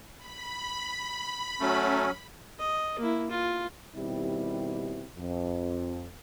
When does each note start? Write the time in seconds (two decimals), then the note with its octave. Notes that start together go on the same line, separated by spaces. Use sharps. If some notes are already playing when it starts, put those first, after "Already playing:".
0.17 B5
1.61 F#3 A3 C#4
2.59 D#5
2.99 A#3 E4
3.30 F4
3.96 B2 D#3 G3 C4 E4 G4
5.16 F2